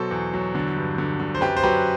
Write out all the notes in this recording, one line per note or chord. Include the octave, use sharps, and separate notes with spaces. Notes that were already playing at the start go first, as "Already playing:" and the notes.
Already playing: B2 F#3 A4 C5
E2
F#3
D3
G2
D3
D3
C5
F#2 G4 B4
C5
F#3 G4 B4